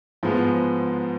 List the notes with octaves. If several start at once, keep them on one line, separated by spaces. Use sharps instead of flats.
G#2 F3 G#3 B3